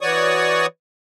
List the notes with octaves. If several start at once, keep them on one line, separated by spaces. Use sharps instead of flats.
E3 F#4 C#5 D5 C#6 D#6